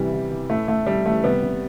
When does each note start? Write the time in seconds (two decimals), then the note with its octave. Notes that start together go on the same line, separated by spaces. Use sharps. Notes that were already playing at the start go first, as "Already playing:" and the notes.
Already playing: C3 E3 G3
0.13 E3
0.31 E3
0.50 A2 A3
0.68 A2 A3
0.87 A2 G3
1.06 E3 A3
1.24 C3 G3 B3
1.43 C3